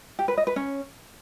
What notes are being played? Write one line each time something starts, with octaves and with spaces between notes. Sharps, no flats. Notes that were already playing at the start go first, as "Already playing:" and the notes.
G4
B4
D#5
B4
C#4